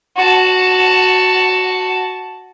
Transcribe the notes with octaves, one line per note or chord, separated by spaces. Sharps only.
F#4 A5